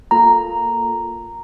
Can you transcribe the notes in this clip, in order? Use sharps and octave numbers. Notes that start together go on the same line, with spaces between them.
A#3 F4 A4 A#5